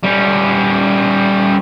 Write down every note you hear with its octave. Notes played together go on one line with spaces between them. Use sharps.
G3 C#4